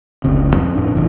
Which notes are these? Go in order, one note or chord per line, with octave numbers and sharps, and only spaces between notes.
F1 C#2 C3
F2
F2 A2 D4
E1 A2 C3 E3